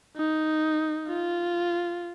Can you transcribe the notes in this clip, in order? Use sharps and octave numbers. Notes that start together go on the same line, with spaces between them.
D#4
F4